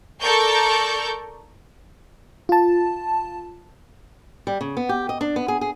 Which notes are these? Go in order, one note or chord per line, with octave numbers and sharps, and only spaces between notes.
A4 A#4 D5 C#6 G6
F4 A5
G3
C#3
B3
G4
D#5
D4
B3
G#4
G#4